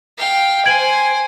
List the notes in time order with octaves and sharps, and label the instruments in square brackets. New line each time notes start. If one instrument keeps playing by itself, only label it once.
[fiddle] F5 G5
[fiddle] C5 G#5 [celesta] G#6 D7 F#7